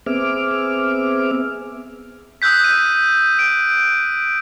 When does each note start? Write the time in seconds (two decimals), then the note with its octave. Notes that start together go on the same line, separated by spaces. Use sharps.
0.06 B3 C4 G#4 E5 D6 F6
2.42 D#6 E6 F#6 G6 B6
2.64 G6 D#7
3.39 D7